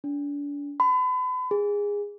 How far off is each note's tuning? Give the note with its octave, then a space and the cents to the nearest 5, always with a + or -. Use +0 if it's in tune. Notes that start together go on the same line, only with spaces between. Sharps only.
D4 -35
B5 +40
G#4 -20